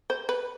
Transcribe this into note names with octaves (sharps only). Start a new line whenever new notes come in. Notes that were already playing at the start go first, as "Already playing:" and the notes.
C5
B4